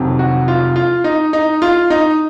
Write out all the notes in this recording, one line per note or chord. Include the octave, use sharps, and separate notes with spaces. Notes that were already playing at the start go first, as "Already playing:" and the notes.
Already playing: F1 F2 C3 D#3 F#3
F#4
F4
F4
D#4
D#4
F4
D#4